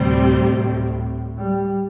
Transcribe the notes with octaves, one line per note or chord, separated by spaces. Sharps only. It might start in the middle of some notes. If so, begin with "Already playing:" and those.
Already playing: D2 A2 C3 G3 C4
G3